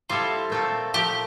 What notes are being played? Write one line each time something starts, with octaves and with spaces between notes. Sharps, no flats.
G3 C4 E4 F4 A4
A#2 A3 C4 F4 A4
A#2 F3 A3 G4